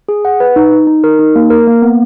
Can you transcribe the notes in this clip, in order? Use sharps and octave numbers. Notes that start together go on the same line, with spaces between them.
G#4
F#5
B4
D#4
D#4
D#4
A#4
D#4
A#3
A#4
A#3
B3